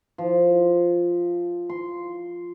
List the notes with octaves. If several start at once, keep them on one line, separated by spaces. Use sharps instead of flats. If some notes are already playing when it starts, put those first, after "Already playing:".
F3
C6